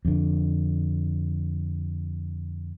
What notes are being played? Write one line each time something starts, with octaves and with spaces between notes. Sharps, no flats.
F2 D3